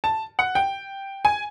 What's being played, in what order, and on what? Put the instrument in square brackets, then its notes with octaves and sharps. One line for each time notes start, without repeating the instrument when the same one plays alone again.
[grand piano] A5
F#5
G5
G#5